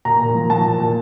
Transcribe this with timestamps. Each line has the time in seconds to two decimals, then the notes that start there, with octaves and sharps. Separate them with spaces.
0.05 A#2 A#5
0.21 A#2
0.35 F3
0.50 F3 A5
0.65 A#2
0.80 A#2